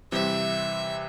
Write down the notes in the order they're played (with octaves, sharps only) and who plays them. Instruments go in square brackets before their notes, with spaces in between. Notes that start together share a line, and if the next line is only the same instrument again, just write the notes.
[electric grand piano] C3 E3 G3 C4 [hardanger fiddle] E5